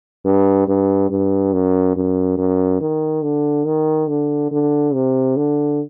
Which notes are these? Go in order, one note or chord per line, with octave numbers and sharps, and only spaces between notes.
G2
G2
G2
F#2
F#2
F#2
D#3
D3
D#3
D3
D3
C3
D3